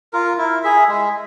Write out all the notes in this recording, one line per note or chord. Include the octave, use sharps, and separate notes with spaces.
F4 A#4
E4
G#4 E5
G#3